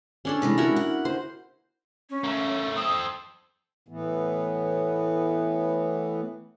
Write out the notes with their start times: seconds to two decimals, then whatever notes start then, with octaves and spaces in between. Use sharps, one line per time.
0.25 C#4 D4 A4
0.42 C3 E3 G#3
0.58 E4 F#4 A#4
0.76 F#5
1.05 C5
2.09 C#4
2.24 A3 A#3
2.76 C4 A4 D#6
3.88 A2 E3 B3